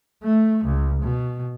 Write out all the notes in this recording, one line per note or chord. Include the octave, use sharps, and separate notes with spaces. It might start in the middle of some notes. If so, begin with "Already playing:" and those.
A3
C#2
B2